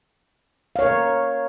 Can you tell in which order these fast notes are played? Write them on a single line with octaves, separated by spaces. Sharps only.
F5 C#5 A#4